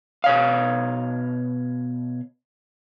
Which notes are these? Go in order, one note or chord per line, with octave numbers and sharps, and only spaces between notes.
B2 C#5 F5